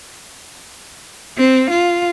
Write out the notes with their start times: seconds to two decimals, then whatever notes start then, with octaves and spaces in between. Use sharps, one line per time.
1.38 C4
1.70 F4